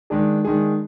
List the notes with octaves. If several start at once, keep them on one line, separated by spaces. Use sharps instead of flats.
D#3 G#3 D4 G#4
D#3 G#3 D4 G#4